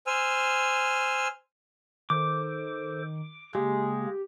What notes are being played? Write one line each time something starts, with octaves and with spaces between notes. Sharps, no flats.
C5 G#5 E6 F6
D#3 A4 C5 D6
C#3 G#3 A#3 G4